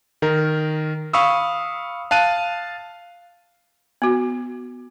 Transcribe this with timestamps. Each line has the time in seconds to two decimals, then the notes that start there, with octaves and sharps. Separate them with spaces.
0.22 D#3 A#4
1.13 F5 B5 C#6 D#6 E6
2.11 F5 A5 F#6 D#7
4.02 B3 F#4